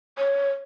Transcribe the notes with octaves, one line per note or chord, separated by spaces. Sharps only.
C#5